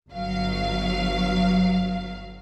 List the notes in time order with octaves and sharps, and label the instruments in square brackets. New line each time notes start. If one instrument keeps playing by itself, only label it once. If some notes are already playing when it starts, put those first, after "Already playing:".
[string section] G1 F#3 F5